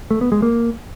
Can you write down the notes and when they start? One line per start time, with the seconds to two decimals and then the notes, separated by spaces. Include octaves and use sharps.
0.11 A3
0.21 B3
0.32 G#3
0.42 A#3